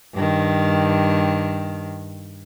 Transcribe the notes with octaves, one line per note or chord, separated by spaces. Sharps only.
G2 D#3